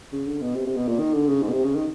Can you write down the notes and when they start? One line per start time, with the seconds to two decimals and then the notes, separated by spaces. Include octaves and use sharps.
0.12 C#3
0.27 D3
0.41 B2
0.56 C3
0.67 C3
0.77 B2
0.88 A#2
0.99 D#3
1.14 D3
1.28 C#3
1.42 G#2
1.48 B2
1.53 C3
1.64 C#3
1.75 D#3